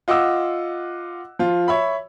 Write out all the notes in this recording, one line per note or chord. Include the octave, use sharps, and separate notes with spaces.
F4 D#5 F#5 D6 E6
F3 F4
C#5 E5 B5